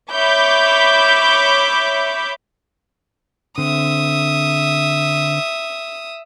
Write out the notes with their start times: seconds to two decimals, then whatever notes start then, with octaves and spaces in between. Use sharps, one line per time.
0.13 C#5 E5 B5 D6 G6
3.58 D3 C4 E5 D#6